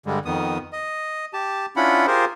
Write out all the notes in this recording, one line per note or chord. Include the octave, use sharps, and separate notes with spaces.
G2 D3 G3 G#3
F2 D#3 B3 D#6
D#5
G4 A5
C#4 D4 E4 F4 F#5 B5
F4 G4 G#4 A#4 C5